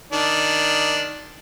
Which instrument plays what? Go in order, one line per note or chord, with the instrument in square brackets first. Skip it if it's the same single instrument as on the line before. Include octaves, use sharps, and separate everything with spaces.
[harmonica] D#3 D4